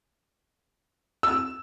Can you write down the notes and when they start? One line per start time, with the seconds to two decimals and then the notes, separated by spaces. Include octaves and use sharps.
1.23 E6